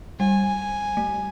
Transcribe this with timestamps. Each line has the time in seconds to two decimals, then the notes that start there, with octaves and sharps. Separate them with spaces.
0.20 G3 G#5
0.97 A3